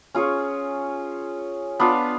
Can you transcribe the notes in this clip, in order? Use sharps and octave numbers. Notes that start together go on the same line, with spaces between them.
C#4 F4 G#4 C#5
B3 D4 F4